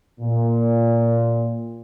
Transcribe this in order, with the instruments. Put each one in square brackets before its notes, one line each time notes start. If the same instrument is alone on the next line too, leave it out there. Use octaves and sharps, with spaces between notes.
[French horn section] A#2